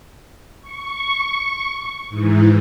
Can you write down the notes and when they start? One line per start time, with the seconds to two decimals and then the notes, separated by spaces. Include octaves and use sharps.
0.61 C#6
2.09 G#2 E3